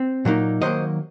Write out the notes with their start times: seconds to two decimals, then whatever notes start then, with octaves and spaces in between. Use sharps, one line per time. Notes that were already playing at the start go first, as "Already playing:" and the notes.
Already playing: C4
0.25 A#2 F#3 A#3 D#4
0.62 D#3 F#3 A#3 C5 D#5